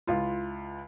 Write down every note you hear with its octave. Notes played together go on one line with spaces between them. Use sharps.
C#2 E4 F4